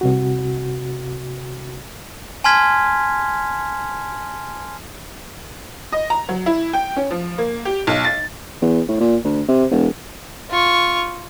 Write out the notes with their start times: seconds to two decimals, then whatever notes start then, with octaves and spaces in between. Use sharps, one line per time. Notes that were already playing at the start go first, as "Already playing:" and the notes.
0.01 C2 C3 F#4
2.44 G#5 A5 C6 F6 G#6 B6
5.92 D#5
6.10 A#5
6.29 F#3
6.46 E4
6.73 G5
6.96 C#4
7.11 F3
7.38 A#3
7.65 G4
7.87 B1
8.05 A6
8.62 E2
8.88 A2
9.00 A#2
9.24 D2
9.48 C3
9.71 E1
10.50 F4 C#6